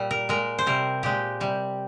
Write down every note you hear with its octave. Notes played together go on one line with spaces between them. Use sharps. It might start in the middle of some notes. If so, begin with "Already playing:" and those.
Already playing: A#2 G3
A#4
A#2 G#3 A#4
C5
C3 G3 A#4
A#2 G#3 G4
C3 G3